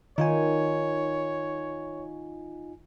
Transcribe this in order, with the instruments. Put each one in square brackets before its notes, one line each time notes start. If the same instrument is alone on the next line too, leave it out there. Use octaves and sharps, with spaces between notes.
[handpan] D#3 [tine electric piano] D#4 F4 G#5 [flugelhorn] C#5